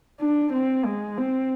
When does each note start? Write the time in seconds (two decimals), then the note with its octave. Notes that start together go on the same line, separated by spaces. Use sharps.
0.20 D4
0.53 C4
0.85 G#3
1.18 C4